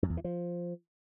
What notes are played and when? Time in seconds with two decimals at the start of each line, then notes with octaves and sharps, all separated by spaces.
0.03 F#2
0.10 E2
0.17 E3
0.24 F3